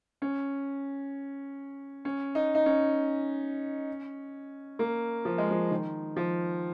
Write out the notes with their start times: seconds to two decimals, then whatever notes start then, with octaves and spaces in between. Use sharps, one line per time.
0.22 C#4
2.05 C#4
2.35 D#4
2.55 D#4
2.66 C#4
4.79 A#3
5.25 F3
5.38 G#3
5.51 F3
5.71 D#3
6.17 F3